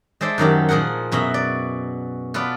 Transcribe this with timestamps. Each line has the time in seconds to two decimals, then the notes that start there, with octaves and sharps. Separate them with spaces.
0.21 G#3 A4 C5 D5 E5
0.38 F#2 D#3 F#3 G4
0.69 A#2 F3 G#4 A#4 F#5
1.12 F#2 B2 F#4 E5 A#5
1.34 D5
2.34 B3 F4 A4 B4 D5